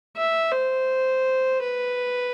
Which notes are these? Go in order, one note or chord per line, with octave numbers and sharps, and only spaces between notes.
E5
C5
B4